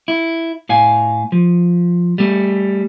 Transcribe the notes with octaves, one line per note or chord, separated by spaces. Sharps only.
E4
A2 F5 G#5
F3
G3 A3